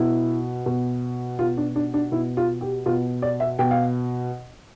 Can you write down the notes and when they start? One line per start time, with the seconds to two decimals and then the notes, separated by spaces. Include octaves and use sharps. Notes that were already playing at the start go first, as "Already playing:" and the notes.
Already playing: B2 E4
0.66 B2
1.39 B2 F4
1.57 D4
1.76 D4
1.94 D4
2.12 B2 E4
2.37 F4
2.61 G4
2.86 B2 F4
3.22 D5
3.40 E5
3.59 B2 G5
3.71 F5